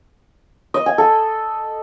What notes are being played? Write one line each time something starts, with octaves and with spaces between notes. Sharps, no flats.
D#5
G#5
A4